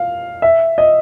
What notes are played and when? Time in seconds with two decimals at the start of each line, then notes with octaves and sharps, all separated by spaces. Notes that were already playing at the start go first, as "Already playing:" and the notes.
Already playing: F5
0.42 E5
0.78 D#5